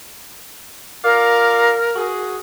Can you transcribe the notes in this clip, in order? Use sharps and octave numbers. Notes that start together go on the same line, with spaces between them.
F4 A#4 D5 F5
F#4 G#4